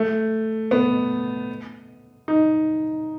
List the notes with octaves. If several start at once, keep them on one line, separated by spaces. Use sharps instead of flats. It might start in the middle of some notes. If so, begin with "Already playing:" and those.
Already playing: A3
B3
D#4